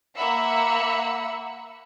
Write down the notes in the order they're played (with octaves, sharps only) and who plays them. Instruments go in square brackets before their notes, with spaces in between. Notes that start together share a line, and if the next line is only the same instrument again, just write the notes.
[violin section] A#3 E5 F#5 B5 E6 C#7